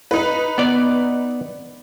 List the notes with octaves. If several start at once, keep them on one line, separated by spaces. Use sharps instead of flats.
D#4 B4
B3 D5